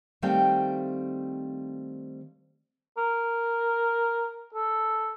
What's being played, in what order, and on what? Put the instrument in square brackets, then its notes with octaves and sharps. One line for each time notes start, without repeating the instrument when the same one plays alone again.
[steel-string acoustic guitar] D#3 G3 A3 C4 F5 G5
[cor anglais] A#4
A4